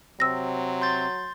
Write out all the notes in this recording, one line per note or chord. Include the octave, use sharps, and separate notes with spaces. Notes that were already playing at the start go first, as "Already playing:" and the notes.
C3 F#3 C4 E6 A#6
C6 G6 A6